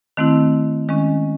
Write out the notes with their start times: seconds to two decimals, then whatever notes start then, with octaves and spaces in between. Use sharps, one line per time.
0.17 D#3 A3 C4 E4
0.88 D#3 G#3 C#4